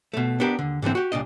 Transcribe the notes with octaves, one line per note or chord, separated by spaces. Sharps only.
B2 A3
B3 D4 G4 A#4
D#2 D3
G#2 D3 E3 C4
F#4 G4
C2 A#2 D4 D#5